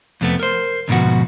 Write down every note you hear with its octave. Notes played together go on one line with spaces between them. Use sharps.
F2 C3 A3 B3
A#4 C5
D2 G#2 B2 F3 F#4